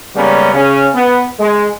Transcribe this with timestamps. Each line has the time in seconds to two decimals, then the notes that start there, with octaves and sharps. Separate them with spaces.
0.14 C#3 G3 G#3 A#3 B3 C#4
0.53 C#3 C#4
0.93 B3
1.39 G#3